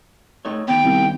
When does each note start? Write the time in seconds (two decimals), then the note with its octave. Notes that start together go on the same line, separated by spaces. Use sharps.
0.45 A3 D#4 C#5
0.68 D#3 B3 G5
0.83 C2